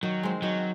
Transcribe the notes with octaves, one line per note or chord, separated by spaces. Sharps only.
D#3 F#3
G#3 C4
D#3 F#3